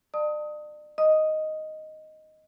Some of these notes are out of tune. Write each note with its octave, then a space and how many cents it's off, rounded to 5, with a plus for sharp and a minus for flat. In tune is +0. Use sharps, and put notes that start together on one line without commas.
D5 +40 A5 +30 D#6 +20
D#5 +0 D#6 +0